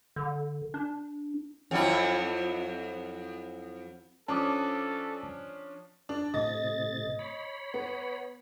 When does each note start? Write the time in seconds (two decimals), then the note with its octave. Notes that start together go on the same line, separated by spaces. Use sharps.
0.16 D3
0.74 D4
1.71 F2 F#3 E4
4.28 F3 C#4 D4 A4 A5 D6 D#6
6.09 D4
6.34 A2 C3 D#5 A6
7.19 C#5 B5
7.74 B3